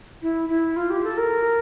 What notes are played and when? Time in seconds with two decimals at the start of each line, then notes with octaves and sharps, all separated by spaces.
0.22 E4
0.49 E4
0.76 F4
0.90 G4
1.04 A4
1.17 A#4